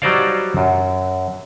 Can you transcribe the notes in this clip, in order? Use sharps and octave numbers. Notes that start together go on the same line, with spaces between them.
F#3 G3 D#4 C5 D5 F5
F#2